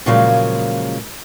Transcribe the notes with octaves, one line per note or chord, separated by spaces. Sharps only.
A#2 C#3 F3 F#3 G#3 A#3